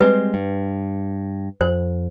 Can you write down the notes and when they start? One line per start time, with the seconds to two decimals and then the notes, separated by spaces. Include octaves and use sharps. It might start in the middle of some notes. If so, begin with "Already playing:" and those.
0.01 G3 G#3 C4 B4
0.34 G2
1.61 F2 C5